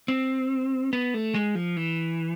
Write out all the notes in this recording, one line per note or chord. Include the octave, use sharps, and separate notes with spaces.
C4
B3
A3
G#3
F3
E3